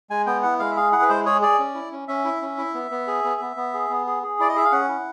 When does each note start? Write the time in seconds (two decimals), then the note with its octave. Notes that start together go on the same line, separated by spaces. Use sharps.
0.10 G#3 G#5
0.26 B3 G5
0.43 E4 F#5
0.59 G#3 F5
0.71 E5
0.76 G#4 F5
0.92 E4 F#5
1.02 B4
1.09 G#3 C5
1.26 G#4 C#5
1.42 G#4 D5
1.59 C#4
1.75 E4
1.92 C#4
2.08 C#4 E5
2.25 E4
2.41 C#4
2.58 E4
2.74 B3
2.91 B3
3.07 G#4
3.24 B3
3.41 B3
3.57 B3
3.74 G#4
3.90 B3
4.07 G#4
4.23 G#4
4.40 E4 D5
4.49 D#5
4.56 G#4 E5
4.65 F5
4.72 C#4 F#5
4.89 E4